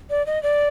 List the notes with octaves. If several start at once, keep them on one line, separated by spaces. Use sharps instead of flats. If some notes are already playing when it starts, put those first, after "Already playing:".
D5
D#5
D5